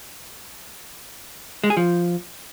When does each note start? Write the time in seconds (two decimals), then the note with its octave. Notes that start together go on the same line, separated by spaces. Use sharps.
1.64 G#3
1.70 G#4
1.77 F3